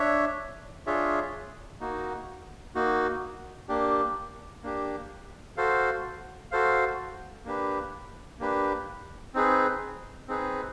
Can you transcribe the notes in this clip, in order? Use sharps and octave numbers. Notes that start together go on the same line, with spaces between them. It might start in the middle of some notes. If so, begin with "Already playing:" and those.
Already playing: D4 C#5 E5
D4 F4 G#4 C#5 E5
A#3 D#4 F#4
A#3 D#4 F#4
A#3 D4 G4
A#3 D4 G4
F#4 A4 C5 F5
F#4 A4 C5 F5
A#3 D4 G4 B4
A#3 D4 G4 B4
C4 D#4 G#4 B4
C4 D#4 G#4 B4